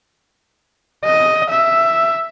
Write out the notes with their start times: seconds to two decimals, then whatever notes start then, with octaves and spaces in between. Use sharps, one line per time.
1.04 D#5
1.50 E5